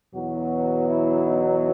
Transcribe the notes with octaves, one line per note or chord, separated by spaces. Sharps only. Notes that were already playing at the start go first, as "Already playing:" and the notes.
E2 B2 F#3 F#4
E4
D#4